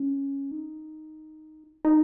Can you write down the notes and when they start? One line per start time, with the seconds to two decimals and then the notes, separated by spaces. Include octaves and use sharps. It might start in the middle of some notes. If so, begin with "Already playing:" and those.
Already playing: C#4
0.51 D#4
1.85 D#4